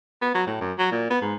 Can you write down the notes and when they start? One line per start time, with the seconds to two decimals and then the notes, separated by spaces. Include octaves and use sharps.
0.22 B3
0.35 F#3
0.47 A2
0.61 F#2
0.78 F#3
0.91 A#2
1.10 B3
1.21 G#2